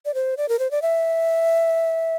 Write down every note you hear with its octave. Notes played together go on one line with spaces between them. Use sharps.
D5
C5
D5
A#4
C5
D5
E5